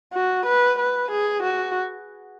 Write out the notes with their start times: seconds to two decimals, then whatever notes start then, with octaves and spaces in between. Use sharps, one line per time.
0.13 F#4
0.46 B4
0.79 B4
1.11 G#4
1.43 F#4